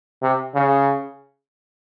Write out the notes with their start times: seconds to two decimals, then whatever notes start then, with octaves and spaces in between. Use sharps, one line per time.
0.22 C3
0.55 C#3